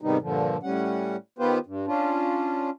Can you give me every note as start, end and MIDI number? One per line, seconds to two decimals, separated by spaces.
0.02 0.17 44
0.02 0.17 48
0.02 0.17 51
0.02 0.17 55
0.02 0.17 59
0.02 0.17 63
0.21 0.57 43
0.21 0.57 46
0.21 0.57 50
0.21 0.57 53
0.63 1.16 45
0.63 1.16 55
0.63 1.16 61
0.63 1.16 78
1.39 1.58 51
1.39 1.58 59
1.39 1.58 65
1.39 1.58 67
1.39 1.58 71
1.39 1.58 72
1.66 1.86 43
1.87 2.70 61
1.87 2.70 62
1.87 2.70 65